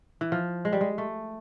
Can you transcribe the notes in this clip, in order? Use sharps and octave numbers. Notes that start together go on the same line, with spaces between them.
E3
F3
G#3
G3
G#3
A3